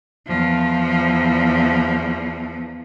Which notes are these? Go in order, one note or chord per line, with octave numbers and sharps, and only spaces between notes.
E2 F3